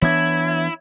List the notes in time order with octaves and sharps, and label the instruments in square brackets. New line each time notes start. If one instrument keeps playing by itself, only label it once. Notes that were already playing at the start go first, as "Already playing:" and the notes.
[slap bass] E3 B3 D4 [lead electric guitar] E4 [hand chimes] C#5 E5 G#6